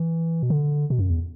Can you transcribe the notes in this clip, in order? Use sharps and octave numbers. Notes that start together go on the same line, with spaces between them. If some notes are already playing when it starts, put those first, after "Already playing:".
Already playing: E3
B2
D3
B2
F#2
E2